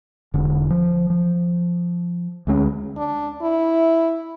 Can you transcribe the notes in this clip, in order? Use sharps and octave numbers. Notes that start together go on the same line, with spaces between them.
E1 D3
F3
F3
D2 G#3 C#4
D4
E4